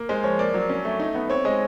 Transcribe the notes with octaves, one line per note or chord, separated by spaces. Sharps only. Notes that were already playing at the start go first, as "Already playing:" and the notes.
Already playing: A#3
G#3 C5
F3 C#5
A#3 D5
F#3
C#4
A3
D#4
B3
C4 C#5
G#3 D#5